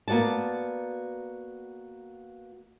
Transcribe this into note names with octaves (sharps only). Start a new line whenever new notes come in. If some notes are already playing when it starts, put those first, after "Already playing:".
A#3 B3 F#4 D5 A5